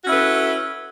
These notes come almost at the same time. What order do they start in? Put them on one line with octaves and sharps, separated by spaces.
F#4 C#4 E4 A4 B4